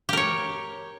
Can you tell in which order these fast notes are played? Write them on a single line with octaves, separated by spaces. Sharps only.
G4 A#4 C#5